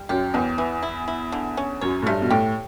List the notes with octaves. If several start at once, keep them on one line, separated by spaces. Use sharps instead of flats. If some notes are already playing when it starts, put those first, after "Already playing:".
Already playing: G3
F#2 G4
E2 E3
E3
E4
E4
D3
C#4
F#2 C#5
A2
G2 A3
B2
A2 G4